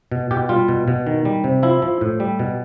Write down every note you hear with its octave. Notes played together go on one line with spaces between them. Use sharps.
B2
B2 G4
G3 F4
B2
B2
D#3
G3
C3
F3 E4
F3
A2
G3
B2